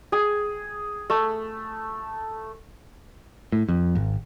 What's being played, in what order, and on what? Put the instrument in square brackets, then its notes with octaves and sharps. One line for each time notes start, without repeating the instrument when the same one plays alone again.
[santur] G#4
A3
[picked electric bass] A2
F2
G#1